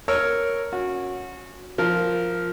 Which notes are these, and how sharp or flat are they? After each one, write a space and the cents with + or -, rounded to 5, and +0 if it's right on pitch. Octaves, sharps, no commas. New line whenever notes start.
A#4 +0 C#5 +0 E6 +0
C#4 +0 F#4 -20
F3 +0 A#4 +0